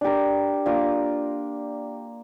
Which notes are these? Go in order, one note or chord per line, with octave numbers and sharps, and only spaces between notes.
D4 G4 A#4
A#3 D4 F4 A#4